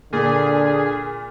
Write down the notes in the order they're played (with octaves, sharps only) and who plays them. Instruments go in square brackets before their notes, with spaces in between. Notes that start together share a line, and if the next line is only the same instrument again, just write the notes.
[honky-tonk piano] A#2 [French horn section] D3 [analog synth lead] G#4